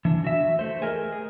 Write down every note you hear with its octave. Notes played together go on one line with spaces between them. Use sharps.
E3 D4
F#4 E5
A3 C5
G#4 A#4 D#5
G#4